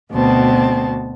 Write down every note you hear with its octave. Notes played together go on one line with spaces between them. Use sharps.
D2 B2 B3 C4 A5